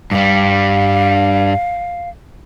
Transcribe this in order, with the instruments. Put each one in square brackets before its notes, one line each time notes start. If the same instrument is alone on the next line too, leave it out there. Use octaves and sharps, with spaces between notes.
[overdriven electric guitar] G2 G3 [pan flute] F5